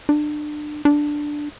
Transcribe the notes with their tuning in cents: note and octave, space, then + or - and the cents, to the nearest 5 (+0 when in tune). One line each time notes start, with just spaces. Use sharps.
D4 +30
D4 +5